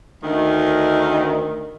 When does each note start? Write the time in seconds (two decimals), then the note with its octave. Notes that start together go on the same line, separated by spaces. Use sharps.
0.23 D2 D#3